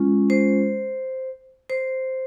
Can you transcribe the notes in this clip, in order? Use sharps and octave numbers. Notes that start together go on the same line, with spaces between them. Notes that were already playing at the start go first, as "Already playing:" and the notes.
Already playing: G#3 C#4 F4
C5
C5